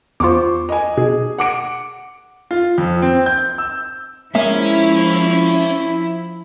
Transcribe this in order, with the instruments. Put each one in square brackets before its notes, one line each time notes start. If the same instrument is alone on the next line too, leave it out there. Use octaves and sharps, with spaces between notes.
[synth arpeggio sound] E2 F4 [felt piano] C5 C#6 D6
[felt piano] D#5 G#5
[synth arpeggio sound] B2 [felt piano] G#4
[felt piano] F#5 D6 D7
[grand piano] F4
F2
C4
G6
E6
[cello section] F3 E4 [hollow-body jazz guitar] G#3 A#3 E5 [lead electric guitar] C#4